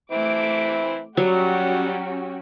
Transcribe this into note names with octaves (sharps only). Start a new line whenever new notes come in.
E3 A3 C4 E4 D6
F#3 G3 C#4 F#4 G4 F#5